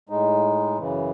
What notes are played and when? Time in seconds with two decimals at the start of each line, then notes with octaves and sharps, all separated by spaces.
0.09 A2 G#3 D#4
0.78 F#2 C#3 E3